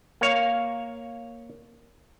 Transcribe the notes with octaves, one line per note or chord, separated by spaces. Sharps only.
A#3 C#5 F5